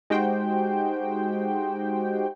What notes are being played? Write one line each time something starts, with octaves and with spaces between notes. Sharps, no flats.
G#3 D#4 F#4 G4 C5 G5